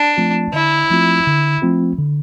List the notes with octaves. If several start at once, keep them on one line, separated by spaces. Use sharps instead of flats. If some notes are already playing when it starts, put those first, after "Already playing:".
Already playing: D4
F3 A3 C4 F4
D3 E4
F3 A3 C4 F4
D3
F3 A3 C4 F4
D3